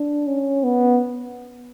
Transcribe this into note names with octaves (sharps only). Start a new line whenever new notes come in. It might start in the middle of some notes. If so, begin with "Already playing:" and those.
Already playing: D4
C#4
B3